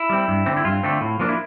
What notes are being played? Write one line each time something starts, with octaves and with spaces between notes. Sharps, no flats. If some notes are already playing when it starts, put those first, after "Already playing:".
Already playing: E4
G3 C4
G2
D3 A3 C4
E4
G2 F4
D3 A3 C4
A2
F3 A#3 D4
E4